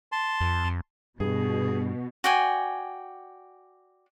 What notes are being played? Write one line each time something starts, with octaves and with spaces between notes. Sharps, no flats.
A5 C6
F2
F2
G2 B2 G#4
F#4 D5 G5 G#5